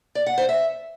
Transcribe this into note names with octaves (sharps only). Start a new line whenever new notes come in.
D5
F#5
C5
E5